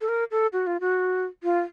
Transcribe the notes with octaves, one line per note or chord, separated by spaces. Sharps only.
A4
A#4
A4
F#4
F4
F#4
F4